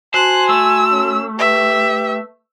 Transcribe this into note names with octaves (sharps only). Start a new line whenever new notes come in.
F#4 C5 G#5 A5 C6 F#6
A3 E6
C#4
G4 B4 E5